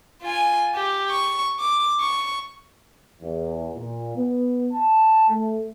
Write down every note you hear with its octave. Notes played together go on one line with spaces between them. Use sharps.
F4 G#5
G4
C#6
D6
C#6
E2
A#2
B3
A5
A3